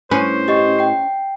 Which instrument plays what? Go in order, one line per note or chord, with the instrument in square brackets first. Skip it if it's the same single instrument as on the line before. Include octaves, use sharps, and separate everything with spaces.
[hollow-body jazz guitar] A2 B4 [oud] C#4 [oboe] C5
[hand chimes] G4 D#5 C#6
G5 C7